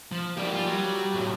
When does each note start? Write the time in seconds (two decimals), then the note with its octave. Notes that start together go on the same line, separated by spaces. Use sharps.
0.12 F3
0.37 G#2 A#3 G4 D5
0.55 F4
0.67 F#3
1.15 A2 C3